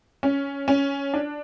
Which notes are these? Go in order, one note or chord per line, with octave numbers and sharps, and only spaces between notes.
C#4
C#4
D4